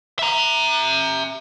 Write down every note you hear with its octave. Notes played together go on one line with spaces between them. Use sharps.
E5 A#5